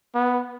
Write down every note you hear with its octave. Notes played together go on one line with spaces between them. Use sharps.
B3